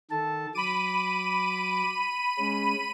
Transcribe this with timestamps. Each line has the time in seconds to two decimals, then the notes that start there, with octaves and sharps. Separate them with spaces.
0.11 D#3 A4 A5
0.55 F#3 B5 D6 D#7
2.38 G#3 C#4